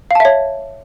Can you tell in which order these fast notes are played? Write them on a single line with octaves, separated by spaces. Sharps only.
F5 A5 E5 C#5